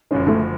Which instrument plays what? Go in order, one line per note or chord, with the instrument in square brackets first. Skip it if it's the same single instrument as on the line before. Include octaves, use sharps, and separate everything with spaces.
[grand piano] F#1 F#2 D3 F3 G#3 [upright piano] C#4
[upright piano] A3